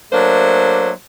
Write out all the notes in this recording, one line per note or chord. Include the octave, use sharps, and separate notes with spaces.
F#3 A3 A#3 D4 C5 E5